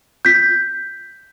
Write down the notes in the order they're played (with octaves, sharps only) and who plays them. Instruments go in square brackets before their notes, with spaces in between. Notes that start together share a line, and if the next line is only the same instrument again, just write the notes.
[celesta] G6 B6